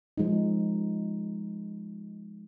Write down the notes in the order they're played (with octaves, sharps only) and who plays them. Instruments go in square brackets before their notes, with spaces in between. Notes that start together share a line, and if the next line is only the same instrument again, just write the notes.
[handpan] F3 G#3 D#4